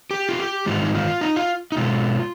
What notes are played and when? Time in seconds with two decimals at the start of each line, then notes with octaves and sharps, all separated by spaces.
0.11 G4
0.29 F4
0.39 G4
0.66 G#2 D#3 G#3 F4
0.82 D#4
0.95 F4
1.21 D#4
1.36 F4
1.72 D#4
1.77 B2 G#3 F4